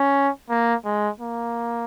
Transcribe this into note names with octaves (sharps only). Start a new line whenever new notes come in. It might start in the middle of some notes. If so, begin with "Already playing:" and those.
Already playing: C#4
A#3
G#3
A#3